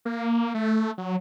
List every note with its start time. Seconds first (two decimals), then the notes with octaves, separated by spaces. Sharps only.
0.05 A#3
0.54 A3
0.98 F#3